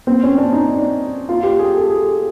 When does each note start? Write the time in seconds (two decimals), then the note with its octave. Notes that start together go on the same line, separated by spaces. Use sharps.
0.07 C4
0.23 C#4
0.38 D4
0.53 D#4
1.29 F4
1.43 G4
1.59 G#4
1.74 A4
1.90 G#4